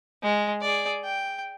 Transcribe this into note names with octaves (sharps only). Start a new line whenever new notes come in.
G#3
G#4 D5
G5